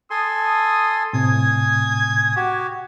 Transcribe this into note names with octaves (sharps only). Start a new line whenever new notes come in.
A4 G#5 C6 D#6
D#6
A2 C3 G#5 D#6 G#6
F#4 G4